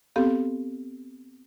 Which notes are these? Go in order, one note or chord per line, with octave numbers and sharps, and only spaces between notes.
B3 C4 G4 A4 F5